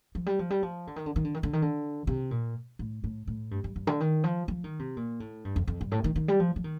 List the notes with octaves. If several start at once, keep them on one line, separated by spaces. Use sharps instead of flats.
F3
G3
F3
G3
F3
D3
D#3
D3
D#3
D3
D#3
D3
D#3
D3
C3
A#2
A2
A2
A2
G2
G2
G2
D3
D#3
F3
F3
D#3
C3
A#2
A2
G2
F2
F2
G2
A2
D#3
D#3
G3
F3
F3
D#3